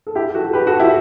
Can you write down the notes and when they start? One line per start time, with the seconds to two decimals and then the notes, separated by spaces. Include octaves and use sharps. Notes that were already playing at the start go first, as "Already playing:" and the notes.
0.07 A4
0.15 E4 G4
0.35 F#4 A4
0.53 G4 B4
0.67 F#4 A4
0.80 E4 G4